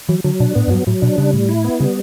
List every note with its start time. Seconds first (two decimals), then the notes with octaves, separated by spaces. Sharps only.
0.09 E3 F#3
0.24 D3 F#3
0.40 B2 D4
0.55 A2 B3
0.67 F#2
0.71 G2 F#3
0.87 A2 F#3
1.02 B2 D4
1.18 C#3 G3
1.33 A2
1.49 E4
1.64 B3
1.80 C#3 G3